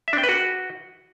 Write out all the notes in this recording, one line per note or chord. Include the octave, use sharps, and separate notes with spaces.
E5
D4
G5
B4
F#4